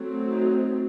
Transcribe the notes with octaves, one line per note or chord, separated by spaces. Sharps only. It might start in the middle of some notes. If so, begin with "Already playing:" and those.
Already playing: F#3 A3 C4
D#4